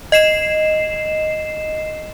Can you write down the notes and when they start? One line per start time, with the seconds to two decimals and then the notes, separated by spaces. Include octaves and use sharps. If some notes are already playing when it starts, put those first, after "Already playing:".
0.12 D#5 C7 E7